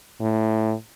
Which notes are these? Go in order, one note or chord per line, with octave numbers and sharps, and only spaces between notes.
A2